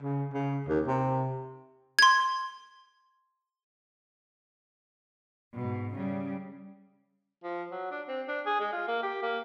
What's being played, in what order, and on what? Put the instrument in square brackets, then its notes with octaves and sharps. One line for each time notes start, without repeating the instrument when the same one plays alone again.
[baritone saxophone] C#3
C#3
D#2
C3
[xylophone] C6 G#6
[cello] G#2 B2
C#3 G3
[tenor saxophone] F3
F#3
D4
C4
D4
G#4
G#3
F4
A#3
G4
A#3